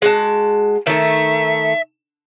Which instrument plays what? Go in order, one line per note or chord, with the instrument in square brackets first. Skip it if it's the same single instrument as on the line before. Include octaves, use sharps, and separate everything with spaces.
[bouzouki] G#3 F#4 A5
[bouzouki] D#3 A3 [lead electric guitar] E5